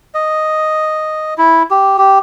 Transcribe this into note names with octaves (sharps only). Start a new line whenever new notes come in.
D#5
E4
G4
G4